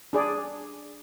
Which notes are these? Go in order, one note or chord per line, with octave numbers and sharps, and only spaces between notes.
D4 G#4 D5